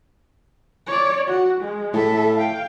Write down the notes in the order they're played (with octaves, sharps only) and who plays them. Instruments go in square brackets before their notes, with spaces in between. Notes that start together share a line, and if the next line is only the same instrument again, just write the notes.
[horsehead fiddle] C#5 D5
F#4
G#3
[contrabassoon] A2 [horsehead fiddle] A4 E5
[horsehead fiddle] F5 G5